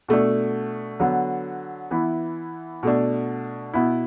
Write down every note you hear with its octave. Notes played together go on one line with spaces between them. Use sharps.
B2 A3 D4
D3 F#3 B3
E3 B3 E4
B2 A3 D4
B2 B3 E4